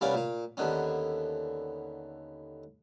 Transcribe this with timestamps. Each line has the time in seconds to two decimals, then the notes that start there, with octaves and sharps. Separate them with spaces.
0.01 C2 G3 B3 C#4 D5 F5
0.14 A#2 F5
0.57 D#2 D3 B3 C#4